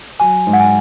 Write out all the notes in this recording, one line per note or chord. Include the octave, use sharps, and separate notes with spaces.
F#3 G#5
G#2
F#5
G#5